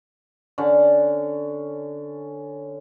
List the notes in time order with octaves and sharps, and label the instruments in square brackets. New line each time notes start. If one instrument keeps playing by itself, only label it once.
[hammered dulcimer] D3 C#4 A5